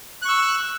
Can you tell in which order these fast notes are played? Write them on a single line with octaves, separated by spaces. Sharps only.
F#6 C#6 E6